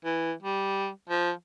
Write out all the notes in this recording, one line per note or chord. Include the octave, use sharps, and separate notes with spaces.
E3
G3
F3